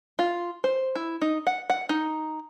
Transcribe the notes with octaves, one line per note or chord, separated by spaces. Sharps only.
F4
C5
E4
D#4
F#5
F#5
D#4